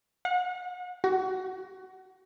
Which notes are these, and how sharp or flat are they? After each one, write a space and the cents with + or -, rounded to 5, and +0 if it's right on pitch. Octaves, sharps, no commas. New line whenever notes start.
F#5 -35
F#4 +30